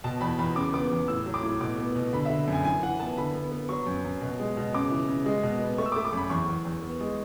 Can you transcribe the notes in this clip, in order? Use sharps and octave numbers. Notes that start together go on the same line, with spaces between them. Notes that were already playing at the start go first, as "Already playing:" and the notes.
B2 A5
E2 B5
E2 B5
C#3 D6
B3 D6
E2
A2 E6
F#3
D6
A2
B2 D6
B3
B2
D3 B5
D3 E5
F#2 G#5
E3 G#5
E3 F#5
B3 A5
D3 B5
B3
B3
F#3 C#6
F#2
F#2
B2
G#3
B2
C#3 D6
E3
C#3
G#3
B2
B3
A3 C#6
E6
D6
A3
D6
F#2 B5
E2 C#6
E2
E2
B3
G#3